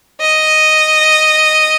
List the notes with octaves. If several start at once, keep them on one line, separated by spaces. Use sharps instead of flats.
D#5